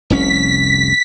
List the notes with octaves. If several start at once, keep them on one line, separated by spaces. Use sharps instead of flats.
F1 C2 C#4 B6